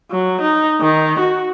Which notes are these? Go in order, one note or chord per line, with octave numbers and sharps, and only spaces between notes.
F#3
D#4
D#3
F#4